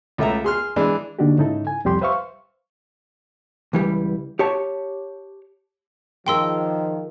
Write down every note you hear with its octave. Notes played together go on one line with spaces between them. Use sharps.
C#2 A3 E5 A#5
G#4 C6 F6
E3 G#3 D4
D3 A#3 D4 D#4 F#4 G4
G#2 C#3 D#4 E4 A4
G#5
C2 F2 G3 G4 C6
B4 C5 E5 F5 C#6
C#2 E3 G3
G4 C#5 A5
D#3 F3 G#4 A#4 G5 C6 E6